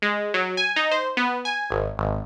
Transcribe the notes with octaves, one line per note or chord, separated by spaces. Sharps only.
G#3
F#3
G#5
D#4
C5
B3
G#5
G#1
G#1